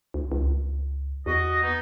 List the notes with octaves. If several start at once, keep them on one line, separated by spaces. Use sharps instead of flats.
D2
C#2
E2 F#4 D#5
B3 D#4